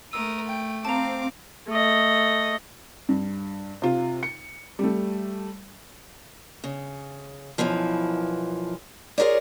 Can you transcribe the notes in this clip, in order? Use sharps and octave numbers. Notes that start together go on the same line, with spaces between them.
A3 A#4 D#6 E6
G5
C4 F5 A5 A#5 D6
A3 D#5
G2
C3 F4
C#7
G3 A3
C#3
F#2 B2 E3 F3
F4 G#4 A#4 C#5 D5